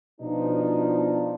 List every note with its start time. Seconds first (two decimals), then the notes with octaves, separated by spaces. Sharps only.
0.21 B2 F3 D4 D#4